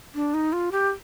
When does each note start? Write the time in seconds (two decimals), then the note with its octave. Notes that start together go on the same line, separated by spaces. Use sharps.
0.15 D4
0.34 D#4
0.53 F4
0.72 G4